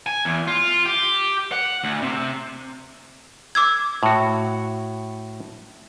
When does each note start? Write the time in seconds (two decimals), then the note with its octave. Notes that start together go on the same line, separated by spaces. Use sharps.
0.06 G#5
0.25 E2
0.47 F4
0.85 G4
1.52 F#5
1.84 D2
2.02 C3
3.55 D6 E6 G#6
4.03 A2 F#4